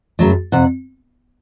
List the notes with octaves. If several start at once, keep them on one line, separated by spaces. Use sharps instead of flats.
F#2 C#3 F#3 A3
F2 C3 F#5